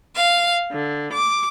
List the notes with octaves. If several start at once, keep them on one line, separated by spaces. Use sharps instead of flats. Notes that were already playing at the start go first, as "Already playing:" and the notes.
F5
D3
D6